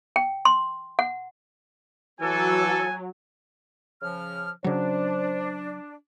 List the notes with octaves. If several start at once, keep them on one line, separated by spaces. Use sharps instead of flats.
G5
C6
F#5
E3 F#3 A4 G#5
C#3 F3 F6
C#3 F#3 D4 C5